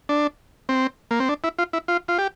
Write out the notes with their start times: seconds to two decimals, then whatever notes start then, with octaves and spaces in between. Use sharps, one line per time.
0.09 D4
0.69 C4
1.11 A#3
1.20 C4
1.29 D4
1.44 E4
1.59 F4
1.73 E4
1.88 F4
2.08 F4
2.18 G4